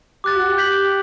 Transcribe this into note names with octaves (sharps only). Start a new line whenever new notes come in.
G4 D6 F#6 A6
F#4
G4
G6 B6 F#7